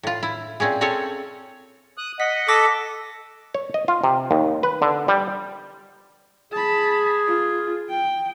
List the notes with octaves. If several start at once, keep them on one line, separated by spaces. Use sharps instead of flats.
A2 F4
E4
A#2 C4 C#4 G#4
C4 C#4 G#4 A4 C#5
D#6 F#6
D#5 F#5 B6
A4 D6 A#6 B6
C#5
D#5
F4
C3
D#2
B4
D3
G3
G#4 A5 B5
F4
G5